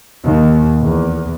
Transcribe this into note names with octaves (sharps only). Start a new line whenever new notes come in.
D#2
E2